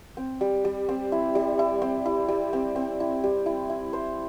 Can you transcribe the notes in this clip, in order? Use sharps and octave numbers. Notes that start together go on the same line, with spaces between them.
C4
G3
G3
C4
E4
G3
E4
C4
E4
G3
C4
C4
E4
G3
E4
E4
C5